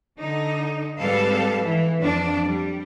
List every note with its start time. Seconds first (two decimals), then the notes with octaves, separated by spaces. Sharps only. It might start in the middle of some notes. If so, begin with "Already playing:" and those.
0.18 D3 D#4
0.99 G#2 G3 C4 A4 B4 F5
1.65 E3
2.01 F2 D4
2.45 G3